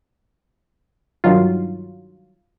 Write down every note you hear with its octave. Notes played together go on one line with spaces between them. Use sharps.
G2 D#3 F#3 F4